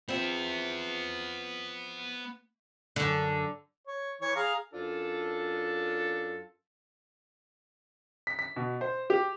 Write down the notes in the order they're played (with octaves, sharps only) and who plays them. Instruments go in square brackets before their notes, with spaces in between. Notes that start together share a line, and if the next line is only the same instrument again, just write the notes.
[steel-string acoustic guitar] F3 C4 [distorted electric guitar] B3 E5
[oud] F#2 D3
[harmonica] C#5
E3 C#5
G#4 F5 A#5
[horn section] F#2 D4 F4 A4
[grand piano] B6
B6
B2
C5
G4